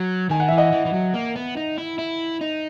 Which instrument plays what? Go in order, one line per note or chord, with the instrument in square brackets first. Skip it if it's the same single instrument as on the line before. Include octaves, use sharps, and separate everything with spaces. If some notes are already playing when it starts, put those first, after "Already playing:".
Already playing: [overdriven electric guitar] F#3
[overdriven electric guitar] D#3 [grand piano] G#5
[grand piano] F#5
[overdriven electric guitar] E3 [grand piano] E5
[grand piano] D#5 F#5
[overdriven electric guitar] E3
E3
F#3
A#3
B3
D#4
E4
E4
D#4